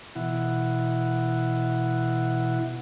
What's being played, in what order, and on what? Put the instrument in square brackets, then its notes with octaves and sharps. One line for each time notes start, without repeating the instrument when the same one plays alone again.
[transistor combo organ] B2 E3 E4 F#5